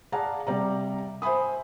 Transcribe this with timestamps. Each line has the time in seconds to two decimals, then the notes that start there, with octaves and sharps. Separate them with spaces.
0.12 G#4 D5 F5 F#5 A5 A#5
0.47 C3 G3 D5 A#5
1.22 C5 E5 G#5 B5 D#6